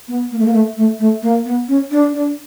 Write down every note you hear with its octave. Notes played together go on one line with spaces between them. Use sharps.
B3
A#3
A3
A#3
A3
A3
A3
A#3
B3
C#4
D4
D4